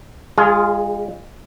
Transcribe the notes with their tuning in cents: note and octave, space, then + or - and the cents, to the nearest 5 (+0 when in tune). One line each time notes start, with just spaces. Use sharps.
G#3 -30 F4 +0 G#4 +10